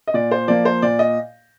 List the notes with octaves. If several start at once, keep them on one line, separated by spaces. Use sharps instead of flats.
D#5
A#2 D5
C5
F3 A#3 D5
C5
A#2 D5
D#5